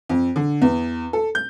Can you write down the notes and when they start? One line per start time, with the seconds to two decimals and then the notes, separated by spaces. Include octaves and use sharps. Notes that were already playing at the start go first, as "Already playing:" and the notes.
0.09 F2
0.36 D3
0.62 E2
1.13 A4
1.35 G6